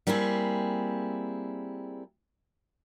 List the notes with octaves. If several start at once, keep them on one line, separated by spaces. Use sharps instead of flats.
G3 A#3 C4 E4 G#4